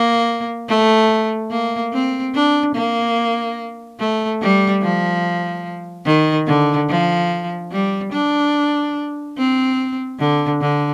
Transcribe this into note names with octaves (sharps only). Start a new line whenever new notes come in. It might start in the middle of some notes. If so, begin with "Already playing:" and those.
Already playing: A#3
A3
A#3
C4
D4
A#3
A3
G3
F3
D#3
D3
F3
G3
D4
C4
D3
D3